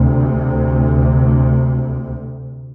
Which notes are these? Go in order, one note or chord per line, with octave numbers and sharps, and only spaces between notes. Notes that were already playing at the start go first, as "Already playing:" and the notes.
Already playing: D2 C3